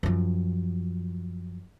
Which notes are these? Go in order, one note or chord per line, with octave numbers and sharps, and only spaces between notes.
F#2 F3